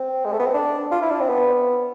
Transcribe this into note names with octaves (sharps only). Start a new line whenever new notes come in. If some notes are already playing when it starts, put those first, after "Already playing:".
Already playing: C4
G#3
A3
B3
C4
D4
F4
E4
D4
C4
B3